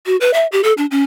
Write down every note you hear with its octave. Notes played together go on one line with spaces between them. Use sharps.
F#4
B4
E5
G4
A4
D4
C#4